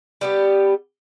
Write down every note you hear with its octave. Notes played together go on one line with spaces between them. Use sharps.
G3 B3 G4